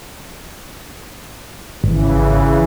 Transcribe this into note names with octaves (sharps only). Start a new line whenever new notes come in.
G#1 C#3 E3